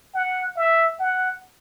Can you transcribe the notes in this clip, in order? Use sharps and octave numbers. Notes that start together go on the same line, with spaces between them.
F#5
E5
F#5